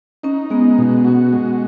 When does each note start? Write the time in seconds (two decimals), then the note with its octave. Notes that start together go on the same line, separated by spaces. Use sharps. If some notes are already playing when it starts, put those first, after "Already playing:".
0.23 C#4 D#4
0.50 G#3 B3
0.78 B2
1.05 F#4
1.33 G#3